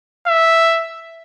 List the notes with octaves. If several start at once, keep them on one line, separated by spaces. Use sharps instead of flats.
E5